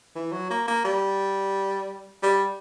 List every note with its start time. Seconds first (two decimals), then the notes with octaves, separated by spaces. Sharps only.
0.16 E3
0.32 F#3
0.50 A#3
0.68 A#3
0.85 G3
2.23 G3